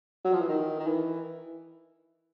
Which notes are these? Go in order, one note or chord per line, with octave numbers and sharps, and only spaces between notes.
F#3
F3
E3
D#3
D#3
E3